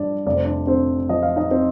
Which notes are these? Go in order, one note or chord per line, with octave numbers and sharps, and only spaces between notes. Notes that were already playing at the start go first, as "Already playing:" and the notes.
Already playing: G2 F3 D4 D5
F1 D5
C5
D4 D5
D3 C4 C5
F3 D#5
F5
D#4 D#5
C4 C5